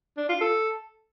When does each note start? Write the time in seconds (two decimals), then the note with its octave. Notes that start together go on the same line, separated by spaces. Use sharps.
0.17 D4
0.29 F4
0.41 A4